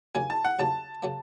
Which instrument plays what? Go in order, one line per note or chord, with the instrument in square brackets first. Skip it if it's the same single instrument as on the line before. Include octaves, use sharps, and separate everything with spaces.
[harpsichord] D#2 C#3 F#3 A#3 [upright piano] G#5
[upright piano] A5
F#5
[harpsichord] D#2 C#3 F#3 A#3 [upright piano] A5
[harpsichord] C#3 F#3 A#3